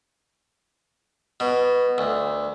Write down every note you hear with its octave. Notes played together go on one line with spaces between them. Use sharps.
B2
D2